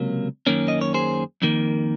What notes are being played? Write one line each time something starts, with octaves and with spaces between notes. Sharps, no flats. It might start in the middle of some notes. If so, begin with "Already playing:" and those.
Already playing: C#2 C3 F#3 A#3
F#2 D#3 A#3 C#4
D#5
C#5
G#4 C5
F2 D#3 A#3